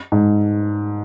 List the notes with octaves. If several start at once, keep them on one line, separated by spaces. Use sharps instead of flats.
G#2